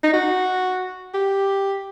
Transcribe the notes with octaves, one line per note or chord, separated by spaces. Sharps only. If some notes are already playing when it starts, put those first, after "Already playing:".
D#4
F#4
G4